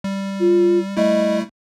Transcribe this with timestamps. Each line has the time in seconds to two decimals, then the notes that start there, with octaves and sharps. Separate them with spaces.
0.04 G3
0.40 F4
0.97 G3 A3 E4 D#5